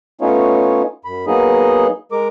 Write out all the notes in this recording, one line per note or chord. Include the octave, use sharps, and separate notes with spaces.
A3 B3 C#4 D#4 F4 C#5
F#2 B5
F#3 A#3 B3 D#4 G#4 D#5
G#3 A#4 D6